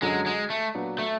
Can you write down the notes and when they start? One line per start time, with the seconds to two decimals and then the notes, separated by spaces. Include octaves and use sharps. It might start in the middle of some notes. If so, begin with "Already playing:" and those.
0.02 F#2 D3 F#3 G#3
0.26 G#3
0.50 A3
0.75 A#2 F#3 B3 D4 F#4
0.99 A3